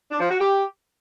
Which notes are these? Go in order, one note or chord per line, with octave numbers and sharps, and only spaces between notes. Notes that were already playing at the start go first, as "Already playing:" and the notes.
D4
F3
F#4
G4